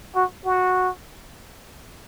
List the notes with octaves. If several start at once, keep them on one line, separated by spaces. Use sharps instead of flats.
F#4
F#4